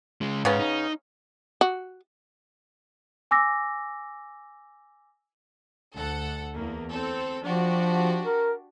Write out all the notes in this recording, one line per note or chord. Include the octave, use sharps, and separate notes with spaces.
C#3 G#3
G#2 C#3 B3 C#4
D#4
F#4
G#5 D6 E6 A#6
D2 A4 F#5
E2 A#3
C4 A4
F3 D4 F#4 G4
A#4